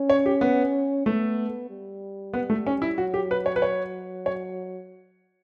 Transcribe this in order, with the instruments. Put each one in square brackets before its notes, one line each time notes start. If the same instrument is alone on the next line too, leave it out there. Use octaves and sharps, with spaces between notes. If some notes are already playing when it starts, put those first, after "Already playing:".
Already playing: [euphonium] C#4
[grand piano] C#5
G4
B3
[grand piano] A3 [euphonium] B3
[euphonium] G3
[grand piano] B3
A3
C#4
E4
[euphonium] F#3 [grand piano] F#4
[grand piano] G4
B4
C#5
B4
C#5
C#5